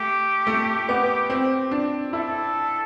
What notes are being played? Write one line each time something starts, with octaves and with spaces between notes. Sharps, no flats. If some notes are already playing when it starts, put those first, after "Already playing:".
Already playing: A3 G4
A3
B3
C4
D4
E4 A4